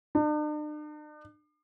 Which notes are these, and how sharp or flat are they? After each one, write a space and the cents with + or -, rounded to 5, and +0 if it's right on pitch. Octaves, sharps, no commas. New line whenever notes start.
D4 +45